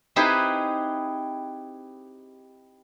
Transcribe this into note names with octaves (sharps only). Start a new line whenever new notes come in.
C4 D#4 E4 G4 G#4 B4